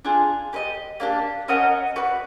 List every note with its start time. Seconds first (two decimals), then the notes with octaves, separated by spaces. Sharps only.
0.05 D4 F4 G#4
0.53 G4 B4 D#5
1.00 A#3 D4 G4
1.48 C#4 F#4 A#4 D#5
1.96 F#4 B4 D5